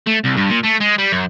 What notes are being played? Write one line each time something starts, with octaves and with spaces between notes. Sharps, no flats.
A3
C2
G2
A#2
A3
G#3
G3
F#2